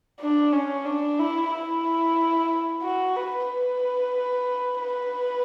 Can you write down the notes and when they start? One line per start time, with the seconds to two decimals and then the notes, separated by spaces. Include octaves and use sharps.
0.21 D4
0.53 C#4
0.85 D4
1.19 E4
1.51 E4
2.82 F#4
3.16 B4
3.48 B4
4.79 B4